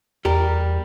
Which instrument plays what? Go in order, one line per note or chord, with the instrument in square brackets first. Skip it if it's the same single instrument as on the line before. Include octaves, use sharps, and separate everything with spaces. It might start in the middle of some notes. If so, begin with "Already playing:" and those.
[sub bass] E2 [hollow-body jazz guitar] G3 G4 A#4